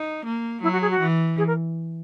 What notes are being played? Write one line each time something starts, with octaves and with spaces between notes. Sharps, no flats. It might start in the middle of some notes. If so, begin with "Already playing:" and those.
Already playing: D#4
A#3
F#3 E4
F#4
G#4
F#4
E3
G#4
A#4